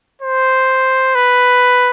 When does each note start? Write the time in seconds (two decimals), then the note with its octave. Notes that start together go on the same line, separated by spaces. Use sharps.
0.22 C5
1.15 B4